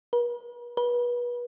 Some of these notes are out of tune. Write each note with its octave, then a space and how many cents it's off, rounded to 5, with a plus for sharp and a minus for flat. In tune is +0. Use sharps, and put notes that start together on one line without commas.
B4 -45
B4 -30